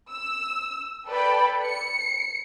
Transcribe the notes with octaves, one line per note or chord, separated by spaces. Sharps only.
E6
A4 B4 D5 G5 B5
C#7